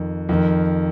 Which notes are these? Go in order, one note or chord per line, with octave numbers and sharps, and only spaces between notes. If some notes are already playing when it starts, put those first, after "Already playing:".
Already playing: F2 D#3
F2 D#3